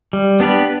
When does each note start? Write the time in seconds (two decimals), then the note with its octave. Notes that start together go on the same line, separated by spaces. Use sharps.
0.13 G3
0.40 B3 D4 G4 B4